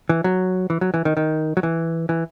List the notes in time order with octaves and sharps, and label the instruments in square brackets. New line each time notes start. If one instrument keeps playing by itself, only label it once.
[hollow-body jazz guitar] E3
F#3
E3
F#3
E3
D#3
D#3
F#3
E3
E3